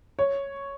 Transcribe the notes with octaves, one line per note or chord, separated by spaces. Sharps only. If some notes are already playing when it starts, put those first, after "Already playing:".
C#5